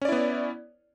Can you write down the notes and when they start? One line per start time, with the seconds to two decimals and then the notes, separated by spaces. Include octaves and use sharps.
0.02 C#4
0.05 D5
0.09 E4
0.12 B3